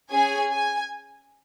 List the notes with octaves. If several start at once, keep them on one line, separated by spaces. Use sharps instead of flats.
C#4 G#4 G#5
G#5